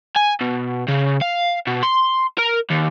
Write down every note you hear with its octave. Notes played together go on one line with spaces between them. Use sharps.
G#5
B2
C#3
F5
B2
C6
A#4
D#2